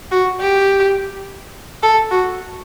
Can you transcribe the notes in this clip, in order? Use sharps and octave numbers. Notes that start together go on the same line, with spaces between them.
F#4
G4
A4
F#4